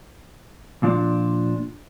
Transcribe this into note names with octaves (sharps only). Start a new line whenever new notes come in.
A#2 F3 D4